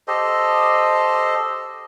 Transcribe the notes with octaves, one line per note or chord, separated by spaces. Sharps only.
G4 A4 C5 D#5